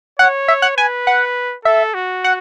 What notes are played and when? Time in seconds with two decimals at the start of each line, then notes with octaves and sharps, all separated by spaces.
0.19 C#5 F#5
0.48 E5
0.62 F#5
0.77 B4 G#5
1.07 F#5
1.65 A4 E5
1.94 F#4
2.24 F#5